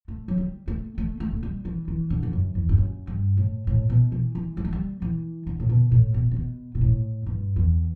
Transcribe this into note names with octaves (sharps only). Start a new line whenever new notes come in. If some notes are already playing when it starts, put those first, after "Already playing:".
A3
F#3
G3
A3
A3
A3
A3
G3
E3
E3
D3
E2
F#2
E2
G2
F#2
G2
A2
A2
B2
E3
E3
G3
A3
G3
E3
D3
A2
B2
A2
B2
C#3
B2
B2
A2
G2
E2